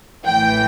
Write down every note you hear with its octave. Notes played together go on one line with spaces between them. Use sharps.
A1 A2 E3 G5